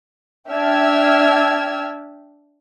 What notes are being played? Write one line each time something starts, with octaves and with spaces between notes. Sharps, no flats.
D4 E5 G5 E6 F6 G#6